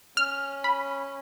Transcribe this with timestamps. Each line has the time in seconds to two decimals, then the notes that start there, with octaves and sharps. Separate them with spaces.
0.17 C#4 F6
0.64 B5